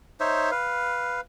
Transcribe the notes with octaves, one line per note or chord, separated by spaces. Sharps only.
D#4 C5 C#5 E5
B4 F5